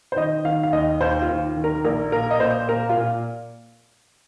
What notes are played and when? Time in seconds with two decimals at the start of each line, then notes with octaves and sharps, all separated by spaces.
0.12 C5
0.16 D#3 D#5
0.45 D#3 F5
0.63 F5
0.73 D#2 D#5
1.01 D#2 C5
1.22 F4
1.29 D#2
1.57 D#3
1.64 A#4
1.84 A#1 A#4
2.12 A#2 A#4
2.31 D#5
2.40 A#2 C5
2.69 A#2 A#4
2.89 F4
2.97 A#2